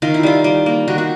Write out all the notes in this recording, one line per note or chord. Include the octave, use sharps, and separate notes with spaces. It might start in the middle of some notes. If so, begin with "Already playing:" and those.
D#3 F4
E4
G3 F4
G3
A#3
D#3 F#4
F#4